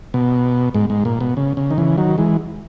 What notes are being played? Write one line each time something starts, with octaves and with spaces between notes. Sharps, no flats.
B2
G#2
G#2
A#2
B2
C#3
C#3
D#3
C#3 E3
D#3 F#3
E3 G#3